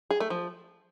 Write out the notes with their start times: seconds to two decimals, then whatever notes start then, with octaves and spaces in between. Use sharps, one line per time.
0.11 G#4
0.20 A3
0.30 F3